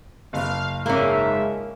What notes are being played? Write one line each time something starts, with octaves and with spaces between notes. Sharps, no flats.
F#1 F5
G#2 A#3 C#4 F4 E5